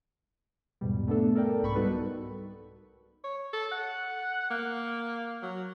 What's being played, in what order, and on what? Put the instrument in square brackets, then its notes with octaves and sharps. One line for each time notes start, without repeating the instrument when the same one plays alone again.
[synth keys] E2 G#2 B2 G3
A3 B3 D4 A4
A4 A#4 D5 G5
C2 G#2 B5 C#6
G3 B3 D#4 F#4 A4 B4
[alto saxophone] C#5
A4
F#5
A#3
F#3